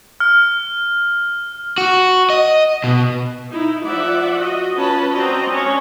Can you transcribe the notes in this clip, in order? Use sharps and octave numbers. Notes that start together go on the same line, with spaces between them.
F6
F#4
D#5
B2
D#4 E4
F3 D5 E5 F#5
F#4 D#5
C#4 F4 B4 A5 B5
C4 F#4 C5 D5 D#5 A#5
C#4 D4 C#5